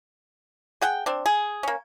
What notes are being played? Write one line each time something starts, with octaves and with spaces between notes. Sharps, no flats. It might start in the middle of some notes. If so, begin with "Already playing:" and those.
G#4 F#5 G5
C4 D4
G#4
A#3 C#4